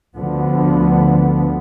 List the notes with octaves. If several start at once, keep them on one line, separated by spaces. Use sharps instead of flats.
D2 D3 F3 B3